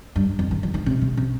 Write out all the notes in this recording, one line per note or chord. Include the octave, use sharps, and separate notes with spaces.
G2
F2
D#3
F3
D#3
C3
C3
C3